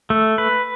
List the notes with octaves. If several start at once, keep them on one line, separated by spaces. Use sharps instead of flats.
A3
B4